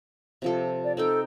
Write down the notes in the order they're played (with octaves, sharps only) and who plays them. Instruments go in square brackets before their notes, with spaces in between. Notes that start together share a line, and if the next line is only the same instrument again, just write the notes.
[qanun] C3 F3 A4
[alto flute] D5
[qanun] C4 D#4 G5 [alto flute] A4